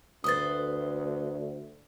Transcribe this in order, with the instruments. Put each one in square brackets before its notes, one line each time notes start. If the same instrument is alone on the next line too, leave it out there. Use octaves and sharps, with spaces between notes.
[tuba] D2 [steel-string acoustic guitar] A4 B4 C5 [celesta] D#6 A6